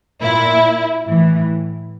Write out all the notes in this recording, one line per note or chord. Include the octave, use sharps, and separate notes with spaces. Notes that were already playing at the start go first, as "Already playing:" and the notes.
A#2 E4
A2 E3